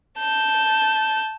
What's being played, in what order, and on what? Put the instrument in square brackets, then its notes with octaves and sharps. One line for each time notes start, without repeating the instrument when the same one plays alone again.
[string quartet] A5 G6